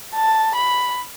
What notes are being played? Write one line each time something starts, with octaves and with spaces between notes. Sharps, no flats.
A5
B5